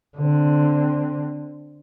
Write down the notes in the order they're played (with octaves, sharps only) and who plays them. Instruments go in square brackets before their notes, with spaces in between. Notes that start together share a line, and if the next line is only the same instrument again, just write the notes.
[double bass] D3 C4